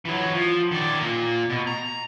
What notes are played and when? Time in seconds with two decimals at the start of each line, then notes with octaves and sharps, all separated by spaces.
0.05 E3 F#3
0.34 F3
0.71 D#3 D5
1.00 A#2 A#4
1.50 B2
1.67 A#5